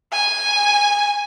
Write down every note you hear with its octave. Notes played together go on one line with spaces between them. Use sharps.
G#5